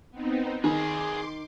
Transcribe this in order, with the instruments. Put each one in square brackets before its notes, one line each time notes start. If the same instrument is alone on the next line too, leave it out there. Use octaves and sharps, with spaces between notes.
[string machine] B3 C4 D#4
[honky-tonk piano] D#3 [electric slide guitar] G#4 B4 [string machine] C6 D6